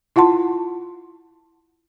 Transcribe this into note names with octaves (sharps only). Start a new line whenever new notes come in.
E4 F4 F#5 A5 C6